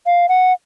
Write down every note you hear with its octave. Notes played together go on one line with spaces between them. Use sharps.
F5
F#5